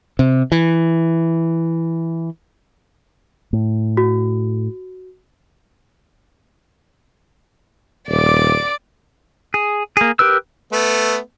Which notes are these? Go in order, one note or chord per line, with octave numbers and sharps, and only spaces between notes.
C3
E3
A2
F#4
D#1 D5 D6
G#4
A#3 G#4
G4 A#4 B4 E6
A3 B3